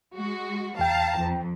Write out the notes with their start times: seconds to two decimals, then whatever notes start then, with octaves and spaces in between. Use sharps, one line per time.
0.13 G#3 F#4
0.79 E2 F5 G5 A5 A#5
1.18 F2